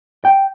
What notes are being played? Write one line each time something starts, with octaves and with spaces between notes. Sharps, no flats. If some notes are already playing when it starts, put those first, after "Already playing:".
G5